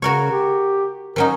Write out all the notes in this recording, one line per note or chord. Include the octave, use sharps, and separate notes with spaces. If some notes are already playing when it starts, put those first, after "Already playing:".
C#3 F#4 A#4 C#5
G4
F#3 C#4 D#4 A#4